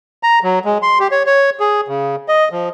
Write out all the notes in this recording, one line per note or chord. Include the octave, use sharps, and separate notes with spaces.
A#5
F#3
G#3
C6
G4
C#5
C#5
G#4
C#3
D#5
F3